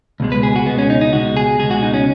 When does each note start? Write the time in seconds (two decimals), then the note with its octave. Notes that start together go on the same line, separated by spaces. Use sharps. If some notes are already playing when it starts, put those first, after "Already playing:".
0.20 C#2 B2 G#3
0.32 B4
0.43 G#4
0.56 F#4
0.66 C#2 B2 G#3 B3
0.78 C#4
0.90 D#4
1.01 D#4
1.13 C#2 B2 G#3 F#4
1.37 G#4
1.59 C#2 B2 G#3 G#4
1.71 F#4
1.83 D#4
1.94 C#4